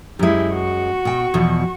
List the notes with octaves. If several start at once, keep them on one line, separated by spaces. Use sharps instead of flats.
F#2 G#3 E4 G4
F#4 C#6
B2 G5
E2 B2 F3